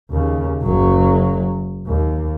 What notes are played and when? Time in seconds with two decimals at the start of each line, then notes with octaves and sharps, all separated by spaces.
0.11 D#2 C#3
0.63 F#1 F#3
1.87 D#2